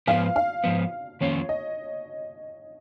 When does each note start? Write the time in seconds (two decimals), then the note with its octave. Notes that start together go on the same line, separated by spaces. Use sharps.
0.07 G#2 F3 B3 F5
0.36 F5
0.64 G#2 F3 B3
1.21 F2 D#3 A#3 C#4 F4 C#5
1.49 D#5